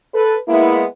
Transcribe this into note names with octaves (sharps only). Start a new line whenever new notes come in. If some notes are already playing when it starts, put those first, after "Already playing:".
A4 B4
G#3 A#3 B3 E4